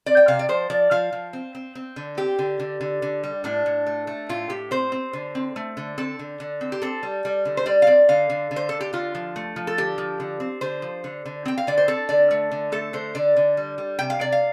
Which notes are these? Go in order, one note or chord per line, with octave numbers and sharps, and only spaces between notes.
C4 D5
G5
C3 F5
D5
F3 C5
F3 D5
F3 F5
F3
C4
C4
C4
D3
C4 G4
D3
D3
D3
D3
G3
A2 D4
A2
A3
A3
A2 F4
A2 G4
C4 C5
C4
D3
C4
A3
D3
C4 A4
D3
D3
C4
G4
C4 A4
G3
G3
D3
C5
G3 D5
F5
C4 D5
D3 F5
D3
D3
C5
D3 A4
G4
D3 F4
F3
A3
F3
A4
D3 G4
F3
D3
C4
D3 C5
F3
D3
D3
C4 G5
F5
D3 D5
C5
C4 A4
D3 D5
A3
D3
A3 A4
D3 C5
D3 D5
D3
G3
G3
C3 G5
F5
C3 D5
F5